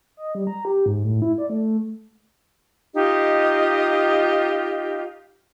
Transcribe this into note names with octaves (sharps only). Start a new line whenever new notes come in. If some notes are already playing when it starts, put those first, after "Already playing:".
D#5
G3
A#5
G4
G#2
A2
E4
D5
A3
D#4 F4 G4 D#5